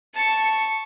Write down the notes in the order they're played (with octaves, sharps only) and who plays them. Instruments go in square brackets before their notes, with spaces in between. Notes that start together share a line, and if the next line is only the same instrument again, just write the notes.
[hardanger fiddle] A5 C#6